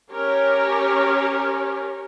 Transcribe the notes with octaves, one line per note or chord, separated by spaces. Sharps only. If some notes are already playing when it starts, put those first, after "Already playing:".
C#4 G4 A#4 C#5